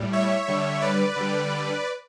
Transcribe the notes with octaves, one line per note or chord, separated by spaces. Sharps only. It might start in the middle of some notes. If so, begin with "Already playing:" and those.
Already playing: A2 G3
C#5 E5
D3 G3
B4 D5
D3 G3